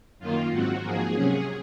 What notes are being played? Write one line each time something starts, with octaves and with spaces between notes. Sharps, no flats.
F#2 D#3 A#3 F4
G#2 F#3 C4 F#4
G#2 F3 A#3 G#4
C3 F#3 C#4